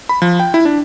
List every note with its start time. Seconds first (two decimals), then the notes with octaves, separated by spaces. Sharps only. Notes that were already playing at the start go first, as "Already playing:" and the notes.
0.09 B5
0.22 F3
0.40 G5
0.54 E4
0.65 D4